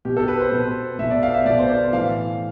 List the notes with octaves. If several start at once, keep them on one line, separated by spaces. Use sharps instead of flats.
B2 G4
A4
B4
C5
B2
B2 E5
D5
F5
E5
B2 D5
C5
D5
A2 E3 F5